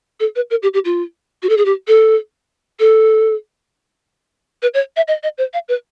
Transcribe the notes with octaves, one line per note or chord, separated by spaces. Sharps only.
A4
B4
A#4
G4
G4
F4
F#4
A4
G#4
G4
A4
A4
B4
C#5
E5
D#5
D#5
C5
F5
B4